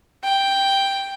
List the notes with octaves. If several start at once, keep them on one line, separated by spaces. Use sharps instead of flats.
G5